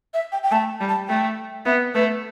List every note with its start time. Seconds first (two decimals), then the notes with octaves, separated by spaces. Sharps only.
0.14 E5
0.32 G5
0.43 G5
0.51 A3 A5
0.80 G3
0.89 A5
1.08 A3 G5
1.65 B3 E5
1.94 A3 B4